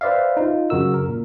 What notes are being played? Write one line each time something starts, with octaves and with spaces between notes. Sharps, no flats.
B4 C5 D5 E5 F5
D#4 F4
F#2 C#3 F#4 A#4 E6
A#4
A#2